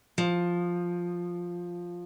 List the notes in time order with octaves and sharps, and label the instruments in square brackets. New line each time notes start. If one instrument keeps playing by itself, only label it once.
[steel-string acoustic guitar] F3